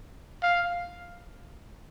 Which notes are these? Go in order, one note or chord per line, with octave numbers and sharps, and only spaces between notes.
F5